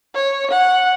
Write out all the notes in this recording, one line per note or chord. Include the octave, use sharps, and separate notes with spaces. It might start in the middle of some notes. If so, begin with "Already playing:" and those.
C#5
F#5